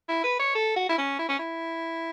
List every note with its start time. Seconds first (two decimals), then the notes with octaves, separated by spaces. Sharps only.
0.09 E4
0.24 B4
0.40 C#5
0.55 A4
0.77 F#4
0.89 E4
0.98 C#4
1.19 E4
1.29 C#4
1.39 E4